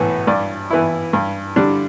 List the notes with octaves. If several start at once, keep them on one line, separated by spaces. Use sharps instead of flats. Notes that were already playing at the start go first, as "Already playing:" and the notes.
Already playing: B1 A2 E3 B3 B4
G2 D5
E3 B3 E4
G2
D3 G3 D4